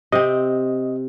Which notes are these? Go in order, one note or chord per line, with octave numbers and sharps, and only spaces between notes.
C3 C4 D#5